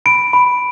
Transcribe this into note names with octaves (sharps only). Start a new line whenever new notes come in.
B5 D7
B5